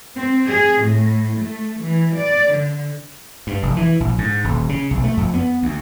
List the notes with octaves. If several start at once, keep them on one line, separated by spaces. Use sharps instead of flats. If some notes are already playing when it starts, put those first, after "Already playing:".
C4
G#4
A2
A3
E3
D5
D3
G2
F1
E3
A#1
G#2
D#1
C#3
B1
A3
F2
B3
D2